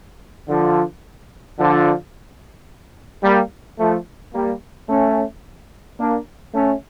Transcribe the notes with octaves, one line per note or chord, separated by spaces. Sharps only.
D3 F3
D3 F3
G3 A#3
F3 A3
G3 A#3
A3 C#4
A#3 D4
A3 C#4